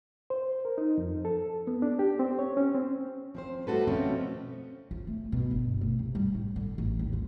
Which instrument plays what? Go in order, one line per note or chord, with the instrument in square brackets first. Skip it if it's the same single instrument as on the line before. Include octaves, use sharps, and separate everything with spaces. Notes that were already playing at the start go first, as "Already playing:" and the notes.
[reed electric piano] C5
A#4
D#4
F2
A4
B3
D4
G4
C4
C#5
C#4
C4
[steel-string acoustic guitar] F3 C4 C5
G3 A3 F#4 A4 B4
B2 F3 A3 C4 C#4
[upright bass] F4
A3
B2
G1
A3
C3
G3
A2
D3
A1
D#2
F4